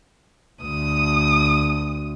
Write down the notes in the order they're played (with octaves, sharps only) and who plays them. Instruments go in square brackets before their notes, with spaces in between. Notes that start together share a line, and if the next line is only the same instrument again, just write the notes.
[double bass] D2 [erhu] D#6